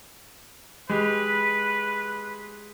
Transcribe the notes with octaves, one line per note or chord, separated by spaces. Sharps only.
G#3 G4 B4